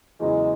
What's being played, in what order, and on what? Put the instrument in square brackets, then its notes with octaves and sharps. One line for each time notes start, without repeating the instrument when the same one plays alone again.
[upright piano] E2 C#3 F#3 C#4 E4 [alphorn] G#3